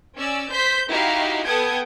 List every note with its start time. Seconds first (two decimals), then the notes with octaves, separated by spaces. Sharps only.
0.17 C#4 D5 E6
0.52 C5 G6 B6
0.89 D#4 E4 F#4 G4 F5
1.45 B3 A4 F#5 G5 D#6 G#6